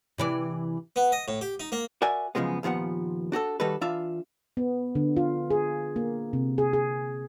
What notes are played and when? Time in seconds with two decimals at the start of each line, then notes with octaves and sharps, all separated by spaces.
0.18 C3 E3 D5
0.96 B3
1.12 D#5
1.28 A2
1.41 G4
1.60 D#4
1.72 A#3
2.02 F#4 A#4 D5 E5 F#5 G#5
2.35 F#2 C#3 F3 G#3 B3
2.63 D#2 A#2 F3 B3 F#5
3.32 D4 F#4 G4 A4
3.60 D#3 G3 F#4 A4 B4
3.81 E3 D4 F4 E5 F5
4.57 B3
4.95 D3
5.17 F4
5.51 G#4
5.96 A#3
6.33 C3
6.58 G#4
6.73 G#4